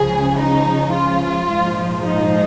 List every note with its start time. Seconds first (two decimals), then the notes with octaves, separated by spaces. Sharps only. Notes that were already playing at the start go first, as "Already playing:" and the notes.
Already playing: C#2 C#3 F3 G#4
0.38 D#4
0.93 F4
1.47 A#1 G#2 F3
2.02 D#4